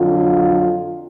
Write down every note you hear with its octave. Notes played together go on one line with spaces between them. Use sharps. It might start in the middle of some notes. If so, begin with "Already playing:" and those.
Already playing: F2 D3 F#3 F4